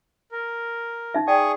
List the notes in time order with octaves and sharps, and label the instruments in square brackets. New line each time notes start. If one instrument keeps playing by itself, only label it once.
[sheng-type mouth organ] A#4
[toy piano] D#4 E5
[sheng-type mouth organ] G#4 C#6 D#6 [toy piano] D5 G5